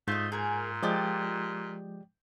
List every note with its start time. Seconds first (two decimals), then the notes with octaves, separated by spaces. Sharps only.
0.08 G#2 A3 F4 D#5 G6
0.32 A#2 G#4 A#4
0.83 F3 G#3 G4 D5 D#5 G6